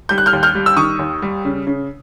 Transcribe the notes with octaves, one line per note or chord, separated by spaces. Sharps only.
G3 G6
F#6
F6 G6
D#2
F6 G6
G3
E6
D#3 C#6 D#6
D#2
G3
C#3
C#3